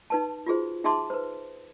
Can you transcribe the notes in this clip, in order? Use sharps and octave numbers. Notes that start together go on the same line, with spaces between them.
D#4 B4 A5
F4 F#4 G#4 C5
D#4 G#4 E5 A5 C6 D6
B4 C5